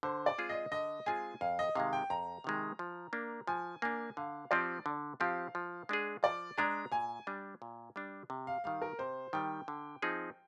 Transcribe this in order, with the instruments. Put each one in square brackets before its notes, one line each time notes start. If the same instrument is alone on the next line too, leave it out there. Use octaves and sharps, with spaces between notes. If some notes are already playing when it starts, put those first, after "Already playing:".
[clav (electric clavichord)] D3 [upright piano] C5
[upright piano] D5
[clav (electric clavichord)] G#3 C4 F4 G#4
[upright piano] D#5
[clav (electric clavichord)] D3 [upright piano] D#5
[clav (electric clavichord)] G#3 C4 F4 G#4 [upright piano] G#5
[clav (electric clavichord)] F2 [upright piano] F5
[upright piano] D#5
[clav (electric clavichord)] C3 D#3 G#3 [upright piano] F5
[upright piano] G5
[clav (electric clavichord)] F2 [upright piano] A#5
[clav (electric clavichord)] C3 D#3 G#3
F3
A#3 D4
[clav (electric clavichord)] F3 [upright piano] G#5
[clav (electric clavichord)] A#3 D4 [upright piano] G#5
[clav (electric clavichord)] D3 [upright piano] F5
[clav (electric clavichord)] F3 C4 G4 [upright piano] D5
[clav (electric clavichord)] D3
[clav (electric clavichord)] F3 C4 G4 [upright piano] F5
[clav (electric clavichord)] F3
G#3 D4 G#4
[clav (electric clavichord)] F3 [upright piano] D5
[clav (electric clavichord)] G#3 D4 G#4 [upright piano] A#5
[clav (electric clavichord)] A#2 [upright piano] G#5
[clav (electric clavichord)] G3 D4
A#2
G3 D4
C3
[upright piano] F5
[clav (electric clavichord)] D#3 G3 [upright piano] F5
[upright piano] A#4
[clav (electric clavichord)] C3 [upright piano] C5
[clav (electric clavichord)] D#3 G3 [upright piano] G5
[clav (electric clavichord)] D3
F3 C4 D#4 G#4